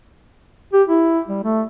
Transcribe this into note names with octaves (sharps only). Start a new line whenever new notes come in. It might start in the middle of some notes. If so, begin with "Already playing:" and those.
G4
E4
G3
A3